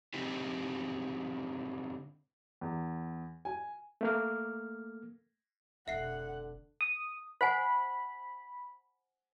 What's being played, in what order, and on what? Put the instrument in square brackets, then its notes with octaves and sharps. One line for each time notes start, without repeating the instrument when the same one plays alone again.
[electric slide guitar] D3 G#3 C4 D#4 G4
[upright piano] E2
G#5
[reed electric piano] A3 A#3 F6
[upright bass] F1 B2 [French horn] D3 [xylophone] E5 C7 [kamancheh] F#5
[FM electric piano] D#6
[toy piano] C5 F#5 G#5 [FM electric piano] B5